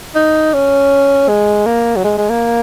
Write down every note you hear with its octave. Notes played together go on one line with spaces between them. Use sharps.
D#4
C#4
G#3
A#3
F#3
G#3
G#3
A#3